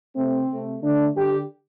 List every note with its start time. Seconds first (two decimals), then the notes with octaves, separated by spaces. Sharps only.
0.16 C3 A3 C4
0.49 C3 A3
0.82 D3 A3 D4
1.15 D3 G3 G4